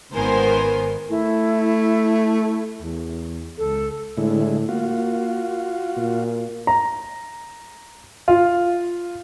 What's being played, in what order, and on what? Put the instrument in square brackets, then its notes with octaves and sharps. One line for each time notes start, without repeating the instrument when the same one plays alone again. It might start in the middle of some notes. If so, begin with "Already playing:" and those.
[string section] G#1 D#3 B3 A#4 C5 G#5
[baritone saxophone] A3 [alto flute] E4
[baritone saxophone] E2
[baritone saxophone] C#2 [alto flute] A4
[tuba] A2 [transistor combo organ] D3 G#3 E4
[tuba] A#3 [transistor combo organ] F4 F#4
[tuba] A#2
[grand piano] A#5
F4